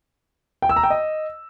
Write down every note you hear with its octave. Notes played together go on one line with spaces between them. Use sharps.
G5
E6
A#5
G5
D#5